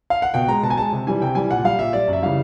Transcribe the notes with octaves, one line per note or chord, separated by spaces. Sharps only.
F5
F#5
B2 G5
G#3 A#5
B2 A5
G#5
G#3 A5
C3
E3 G3 G#5
C3 G5
E3 G3 G#5
A#2 F#5
G3 F5
A#2 E5
G3 D5
F#2
E5
C#3 E3 G3 F5